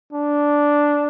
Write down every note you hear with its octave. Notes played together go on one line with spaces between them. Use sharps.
D4